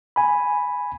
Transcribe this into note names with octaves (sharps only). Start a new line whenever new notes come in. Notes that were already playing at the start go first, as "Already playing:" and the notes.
G#5 B5